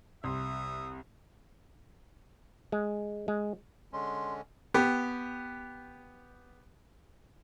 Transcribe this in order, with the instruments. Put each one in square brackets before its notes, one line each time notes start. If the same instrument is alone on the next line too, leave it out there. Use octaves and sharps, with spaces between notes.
[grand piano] C2 C6 [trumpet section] E5 D#6
[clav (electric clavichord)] G#3
G#3
[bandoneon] D3 G#3 C#4 [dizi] C6
[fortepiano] B3 G4